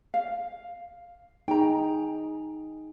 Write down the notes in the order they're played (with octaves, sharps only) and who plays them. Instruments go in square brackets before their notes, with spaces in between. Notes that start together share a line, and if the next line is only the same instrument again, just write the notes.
[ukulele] F5
[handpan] D#4 G#4 [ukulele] G5 A#5